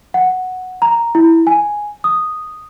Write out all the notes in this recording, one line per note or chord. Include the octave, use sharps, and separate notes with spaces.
F#5
A#5
E4
G#5
D#6